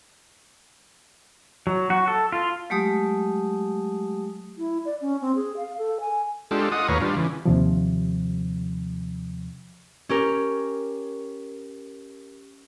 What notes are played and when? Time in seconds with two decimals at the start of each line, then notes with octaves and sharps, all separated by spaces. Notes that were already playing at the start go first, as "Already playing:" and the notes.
1.67 F#3
1.90 F#4
2.08 A4
2.32 F4
2.70 F#3 G#3 A3 G4 D#6
4.58 E4
4.85 D5
5.01 C#4
5.22 C4
5.36 G#4
5.57 F5
5.78 A4
6.00 G#5
6.51 G#3 D4 F4 G4 A4
6.72 F4 D#5 F#5 D#6
6.88 D#2 A2 B4 C#5 F5 A#5
7.01 G3 D4 F4
7.16 C#3 E3
7.45 D#2 C3 F3
10.09 C#4 G4 A#4